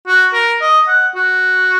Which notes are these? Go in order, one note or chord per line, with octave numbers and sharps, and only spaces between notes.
F#4
A#4
D#5
F#5
F#4